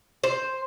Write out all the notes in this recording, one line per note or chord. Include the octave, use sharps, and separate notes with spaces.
C5